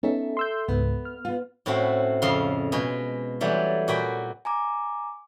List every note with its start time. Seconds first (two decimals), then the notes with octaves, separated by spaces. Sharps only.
0.03 B3 C#4 D#4 A4 E5
0.37 C6 E6 G6
0.68 C#2 G#2 B3
1.05 F6
1.25 B3 F4
1.66 A2 C4 C#4 E4 F#4
2.22 F2 C#3 F5 C6
2.72 B2 G#3
3.41 E3 F#3 G3 A3
3.88 A#2 F#4 G5 B5
4.45 G#5 A#5 D6